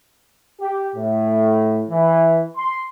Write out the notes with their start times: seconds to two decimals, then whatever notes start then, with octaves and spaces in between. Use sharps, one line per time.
0.60 G4
0.95 A2
1.89 E3
2.56 C6